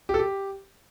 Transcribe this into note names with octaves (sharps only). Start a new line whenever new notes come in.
G4
A4
G4